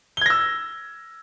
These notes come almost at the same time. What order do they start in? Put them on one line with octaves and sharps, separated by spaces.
G7 G#6 A#6 E6